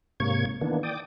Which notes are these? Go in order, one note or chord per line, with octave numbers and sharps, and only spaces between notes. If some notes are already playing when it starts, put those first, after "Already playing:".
G#2 C3 A#3 C#5 C#6 G#6
D#3 E3 A#3 B3 D4
D5 G5 D6 D#6